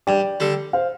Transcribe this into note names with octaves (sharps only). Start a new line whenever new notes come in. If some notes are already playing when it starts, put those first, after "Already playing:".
G2 D5 G5
D3 G3
C5 F5